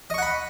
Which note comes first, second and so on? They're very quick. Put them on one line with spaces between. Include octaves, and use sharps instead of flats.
D#5 C#6 F#5 B5